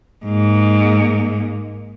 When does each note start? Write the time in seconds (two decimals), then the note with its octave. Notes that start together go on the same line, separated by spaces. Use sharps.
0.25 G#2 A#3